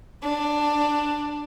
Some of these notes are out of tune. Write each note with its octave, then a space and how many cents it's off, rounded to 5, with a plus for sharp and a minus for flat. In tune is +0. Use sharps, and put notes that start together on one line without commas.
D4 +10